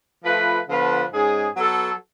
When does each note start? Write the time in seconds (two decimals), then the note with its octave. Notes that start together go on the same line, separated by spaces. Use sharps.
0.24 F3 A3 F4 B4
0.68 D3 F3 B3 F4 B4
1.12 G#2 G#3 C#4 G#4
1.56 F#3 B3 F#4 A4